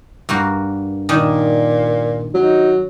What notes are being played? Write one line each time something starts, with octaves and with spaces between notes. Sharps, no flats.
G2 A#3 F#4
A#2 D#3 D4
F#3 D#4